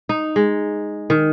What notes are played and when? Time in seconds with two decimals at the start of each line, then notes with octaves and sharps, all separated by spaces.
0.09 D#4
0.36 G#3
1.10 D#3